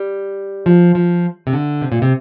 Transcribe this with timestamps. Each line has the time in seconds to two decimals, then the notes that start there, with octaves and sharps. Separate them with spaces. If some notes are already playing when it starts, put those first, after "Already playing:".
Already playing: G3
0.66 F3
0.95 F3
1.47 C3
1.53 D3
1.81 C3
1.92 A#2
2.02 C3